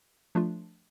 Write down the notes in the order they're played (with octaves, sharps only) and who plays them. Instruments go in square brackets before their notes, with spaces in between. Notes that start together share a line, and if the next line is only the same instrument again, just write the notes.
[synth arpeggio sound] F3 A3 D4 F4